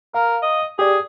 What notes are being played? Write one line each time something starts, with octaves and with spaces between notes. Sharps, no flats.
A#4 F5
D#5
G4 G#4 D5